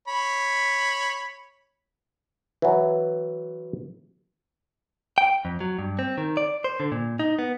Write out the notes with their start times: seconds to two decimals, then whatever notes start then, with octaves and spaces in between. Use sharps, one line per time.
0.08 C#5 B5
2.62 E3 F#3
5.18 G5
5.45 F2
5.61 F#3
5.79 G2
5.99 C4
6.18 D#3
6.37 D5
6.64 C5
6.80 D3
6.92 A#2
7.19 D#4
7.39 B3